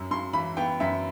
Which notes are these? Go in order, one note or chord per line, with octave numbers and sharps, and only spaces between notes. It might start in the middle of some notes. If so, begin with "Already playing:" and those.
Already playing: F#2
F#2 C6
E3 B5
B3 G5
F#2 E5